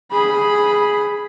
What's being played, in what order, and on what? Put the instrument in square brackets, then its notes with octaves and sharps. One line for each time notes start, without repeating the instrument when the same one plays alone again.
[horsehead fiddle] G#4 B5